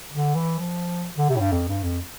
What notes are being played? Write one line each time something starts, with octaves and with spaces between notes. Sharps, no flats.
D3
E3
F3
D3
C3
A2
G2
F2
G2
F2